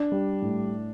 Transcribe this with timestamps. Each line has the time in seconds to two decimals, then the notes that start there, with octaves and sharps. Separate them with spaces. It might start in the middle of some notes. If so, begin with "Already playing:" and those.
Already playing: D4
0.12 G3
0.42 A2